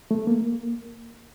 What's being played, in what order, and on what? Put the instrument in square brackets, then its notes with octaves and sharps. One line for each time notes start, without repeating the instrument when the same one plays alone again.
[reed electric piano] A3
A#3